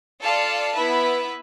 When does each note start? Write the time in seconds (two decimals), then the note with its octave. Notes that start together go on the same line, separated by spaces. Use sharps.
0.21 F4 A4 D5 F5 A5
0.74 B3 E4 B4 E5